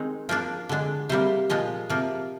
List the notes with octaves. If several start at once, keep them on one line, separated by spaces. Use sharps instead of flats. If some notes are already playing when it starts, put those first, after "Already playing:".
Already playing: D#3 G#3 C4 D#4 G#4
F3 A#3 D4 A#4
D3 G#3 D4
C3 G3 A#3 C5
A#2 F3 G#3 D#5
C3 F3 A#3